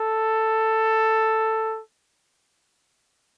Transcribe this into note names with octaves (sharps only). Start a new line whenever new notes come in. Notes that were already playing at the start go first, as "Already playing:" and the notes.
Already playing: A4